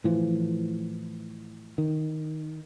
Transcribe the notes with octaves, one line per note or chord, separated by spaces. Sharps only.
A2 E3 F3
D#3